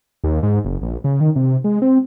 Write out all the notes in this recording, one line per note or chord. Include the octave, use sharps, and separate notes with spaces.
D#2
G#2
F#1
A#1
C#3
D#3
C3
G#3
C4